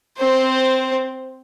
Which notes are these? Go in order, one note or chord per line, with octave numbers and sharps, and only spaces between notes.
C4 C5